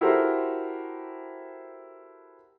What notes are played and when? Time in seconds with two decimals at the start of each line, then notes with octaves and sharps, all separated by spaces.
0.01 E4 F#4 G4 A4 A#4 C5